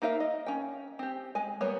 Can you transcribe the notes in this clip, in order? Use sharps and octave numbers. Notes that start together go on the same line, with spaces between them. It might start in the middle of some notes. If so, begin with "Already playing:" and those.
A#3 D#4 A#4 E5 F5
D#5
C#4 G5
C4 G4
G#3 G#5
G3 A#3 B3 C#5